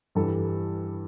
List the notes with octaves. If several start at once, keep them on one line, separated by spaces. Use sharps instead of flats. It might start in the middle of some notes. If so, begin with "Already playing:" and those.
G2 E3 G3 A4